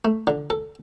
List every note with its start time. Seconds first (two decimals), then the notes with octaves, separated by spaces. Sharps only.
0.05 A3
0.27 D3
0.50 A4